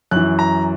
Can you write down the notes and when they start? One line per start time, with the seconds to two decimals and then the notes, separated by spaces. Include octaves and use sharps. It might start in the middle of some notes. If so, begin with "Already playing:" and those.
0.11 F#2 E3 F#6
0.39 A#5